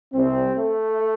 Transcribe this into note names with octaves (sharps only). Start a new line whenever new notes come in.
C2 C3 G3 C4
A3